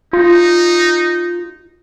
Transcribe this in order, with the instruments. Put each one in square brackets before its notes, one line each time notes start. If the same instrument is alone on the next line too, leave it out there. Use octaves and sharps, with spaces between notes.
[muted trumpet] D#4 [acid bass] F4